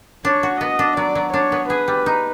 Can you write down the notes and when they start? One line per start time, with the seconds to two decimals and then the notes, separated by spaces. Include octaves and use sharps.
0.25 D4 C#5
0.43 F#4
0.61 B3 D#5
0.79 D4
0.97 F#3 D5
1.15 F#3
1.34 D4 C#5
1.52 B3
1.70 G#4 B4
1.88 G3
2.06 D#4